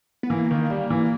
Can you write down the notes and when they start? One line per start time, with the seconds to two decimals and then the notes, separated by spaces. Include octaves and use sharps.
0.23 B3
0.30 E3 A#3
0.51 D#3
0.70 G3
0.90 E3